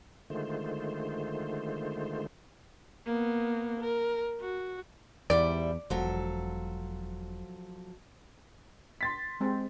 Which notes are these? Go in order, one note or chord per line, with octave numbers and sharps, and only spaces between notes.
D3 D#3 G#3 A3 F4 C5
A#3 B3
A#4
F#4
E2 G#2 G3 E4 D5
E1 F3 F#3 A4
C6 A6 B6
G#3 C4